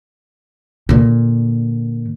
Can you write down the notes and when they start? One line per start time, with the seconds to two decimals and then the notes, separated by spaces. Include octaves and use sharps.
0.89 A#2 D3